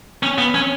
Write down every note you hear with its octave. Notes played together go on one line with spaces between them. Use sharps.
C#4
B3
C#4